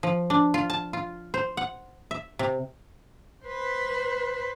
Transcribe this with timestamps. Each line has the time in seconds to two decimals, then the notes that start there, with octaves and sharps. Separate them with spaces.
0.03 F3
0.30 D4
0.54 F4
0.70 A5
0.93 F4
1.34 C5
1.57 F#5
2.11 E5
2.39 C3
3.45 B4 C5